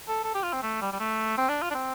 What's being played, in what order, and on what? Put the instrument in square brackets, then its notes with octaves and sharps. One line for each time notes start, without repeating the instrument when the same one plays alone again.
[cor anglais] A4
A4
G4
F4
C4
A3
G3
G3
A3
C4
D4
F4
D4
C4